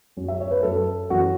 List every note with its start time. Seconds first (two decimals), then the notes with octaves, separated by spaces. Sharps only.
0.17 F#2 F#3 C#4
0.28 E5
0.40 C#5
0.51 B4
0.63 F#2 F#3 C#4 A4
1.10 F#2 E3 C#4 F#4